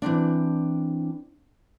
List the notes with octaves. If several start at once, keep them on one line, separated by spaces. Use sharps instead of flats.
E3 A#3 C4 D4